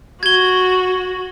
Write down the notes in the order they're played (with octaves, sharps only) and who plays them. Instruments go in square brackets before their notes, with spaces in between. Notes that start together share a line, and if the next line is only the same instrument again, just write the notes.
[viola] F#4 [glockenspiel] G#6 G7